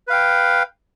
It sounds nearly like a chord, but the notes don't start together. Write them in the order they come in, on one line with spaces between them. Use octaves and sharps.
B4 F5 G5